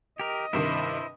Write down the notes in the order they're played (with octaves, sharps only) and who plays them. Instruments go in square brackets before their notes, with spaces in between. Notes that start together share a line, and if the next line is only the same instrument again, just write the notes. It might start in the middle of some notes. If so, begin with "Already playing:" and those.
[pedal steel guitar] G4 A#4 [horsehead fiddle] D#5
[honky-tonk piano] G2 C3 D#3 [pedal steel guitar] E4 C5